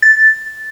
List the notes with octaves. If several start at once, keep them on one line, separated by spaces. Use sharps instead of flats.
A6